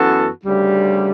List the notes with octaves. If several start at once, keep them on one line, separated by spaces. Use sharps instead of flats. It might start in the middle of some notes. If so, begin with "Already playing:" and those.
Already playing: F#2 E3 B3 F#4 A4
D2 C#3 G3